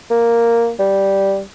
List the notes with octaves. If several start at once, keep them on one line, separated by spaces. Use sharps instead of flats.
A#3
G3